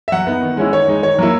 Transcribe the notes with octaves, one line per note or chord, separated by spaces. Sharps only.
E5
F#3 F#5
B3 D#4
D#3
G#3 C#4 E4
D#3 C#5
G#3 D#4
D#3 C#5
F#3 A#3 E4